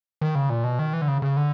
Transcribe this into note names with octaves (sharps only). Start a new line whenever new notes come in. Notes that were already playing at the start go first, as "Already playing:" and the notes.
D#3
C#3
A#2
B2
D#3
E3
D3
C#3
C#3
D3